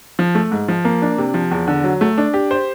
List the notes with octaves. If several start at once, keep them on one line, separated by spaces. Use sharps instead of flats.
F3
A3
G#2
F3
A#3
D4
C3
F3
E2
D3
F#3
A3
D4
G4
C5